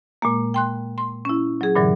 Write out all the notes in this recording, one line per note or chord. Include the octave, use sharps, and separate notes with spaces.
A#2 G#3 A#3
G5 C6 F#6
C6
C#4 E4
F#3 G#4
G2 A#2 D3 E3 F#3